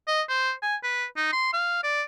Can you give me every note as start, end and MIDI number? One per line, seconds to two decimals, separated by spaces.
0.07 0.22 75
0.29 0.52 72
0.62 0.76 80
0.83 1.05 71
1.17 1.30 63
1.33 1.52 84
1.53 1.82 77
1.83 2.02 74